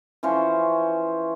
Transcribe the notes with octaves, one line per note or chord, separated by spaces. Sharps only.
E3 F3 C#4 C5